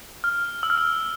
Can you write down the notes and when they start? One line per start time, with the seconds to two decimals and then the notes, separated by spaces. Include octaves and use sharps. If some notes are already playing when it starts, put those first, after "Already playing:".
0.24 F6
0.63 E6
0.70 F6
0.77 E6